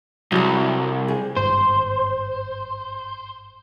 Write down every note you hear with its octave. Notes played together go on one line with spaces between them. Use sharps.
C2 F#3 A4
G#4
G#1 G2 C5